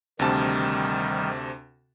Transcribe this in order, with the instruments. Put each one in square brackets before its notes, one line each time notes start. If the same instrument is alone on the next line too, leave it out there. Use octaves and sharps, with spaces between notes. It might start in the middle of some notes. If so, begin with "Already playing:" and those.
[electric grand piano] D2 C3 A5 [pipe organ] D#3 G3